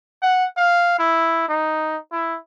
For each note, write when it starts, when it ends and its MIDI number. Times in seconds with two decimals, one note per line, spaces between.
0.22 0.45 78
0.57 0.94 77
0.99 1.45 64
1.48 1.96 63
2.12 2.37 64